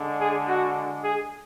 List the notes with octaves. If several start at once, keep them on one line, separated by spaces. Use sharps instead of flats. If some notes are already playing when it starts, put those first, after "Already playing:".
Already playing: D3 G#3
G#4
F#4
G#4